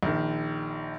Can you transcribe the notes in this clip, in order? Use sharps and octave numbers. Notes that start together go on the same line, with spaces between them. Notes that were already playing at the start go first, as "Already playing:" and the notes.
A#1 D#3